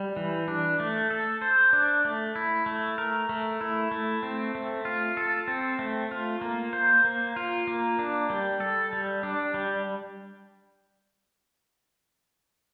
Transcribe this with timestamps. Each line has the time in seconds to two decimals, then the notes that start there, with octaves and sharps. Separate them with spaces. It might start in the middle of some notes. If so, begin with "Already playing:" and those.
Already playing: G3
0.17 E3
0.48 D4
0.80 A3
1.10 A4
1.42 C5
1.73 D4
2.05 A3
2.36 E4
2.66 A3
2.98 A#4
3.29 A3
3.61 E4
3.92 A3
4.23 C4
4.55 A3
4.85 F4
5.17 A4
5.48 C4
5.79 A3
6.11 F4
6.41 A#3
6.73 C5
7.05 A#3
7.36 F4
7.68 A#3
7.99 D4
8.30 G3
8.60 A4
8.93 G3
9.23 D4
9.54 G3